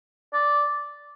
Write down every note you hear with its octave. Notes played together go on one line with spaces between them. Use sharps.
D5